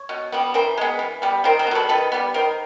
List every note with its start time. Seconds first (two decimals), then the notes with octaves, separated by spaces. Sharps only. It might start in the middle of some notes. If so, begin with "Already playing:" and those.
Already playing: C#5
0.09 B2
0.32 G3 B3
0.54 E3 A#4 C5
0.78 G#3 B3
0.99 E3
1.22 G3 B3
1.44 D#3 A#4 C5
1.59 A#4 C5
1.67 B3
1.71 F#3 A4 B4
1.89 D#3 A4 B4
2.12 G3 B3
2.34 D#3 A#4 C5